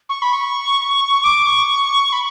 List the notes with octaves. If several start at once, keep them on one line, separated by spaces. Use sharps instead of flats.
C#6
B5
C#6
D6
C#6
B5